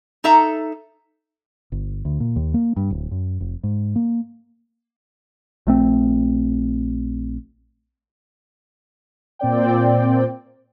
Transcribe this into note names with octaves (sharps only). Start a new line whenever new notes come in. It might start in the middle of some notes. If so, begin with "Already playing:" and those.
D#4 A4 E5 A#5
G1
D2
A#2
D#2
A#3
G2
D1
F#2
F1
G#2
A#3
A#1 A3 C4
A#2 C4 D5 G5